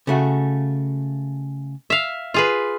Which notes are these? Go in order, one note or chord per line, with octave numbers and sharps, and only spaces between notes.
C#3 A3 F#4
E5 F5
F4 G#4 B4